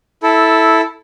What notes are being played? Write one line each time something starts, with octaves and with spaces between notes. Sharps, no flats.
E4 A4